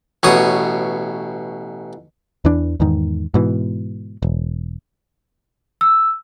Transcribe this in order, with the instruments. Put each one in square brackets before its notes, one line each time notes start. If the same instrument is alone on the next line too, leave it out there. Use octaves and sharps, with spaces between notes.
[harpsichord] A1 B2 C#5 D#6
[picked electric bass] E2 E3 D4
E2 G#2 D#3
G#2 B2 E3
E1
[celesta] E6